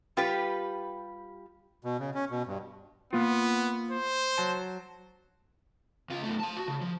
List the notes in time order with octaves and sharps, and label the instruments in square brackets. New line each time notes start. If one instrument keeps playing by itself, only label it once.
[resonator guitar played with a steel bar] G3 F4 G4 B4
[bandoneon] B2
C#3
C#4
B2
G2
[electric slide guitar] A#3 F4 [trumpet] B3
[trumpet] C5
[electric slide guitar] F#3 A5
[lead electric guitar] C#2 F4
F#2 A3
F5 A5
F#4
C#3
F3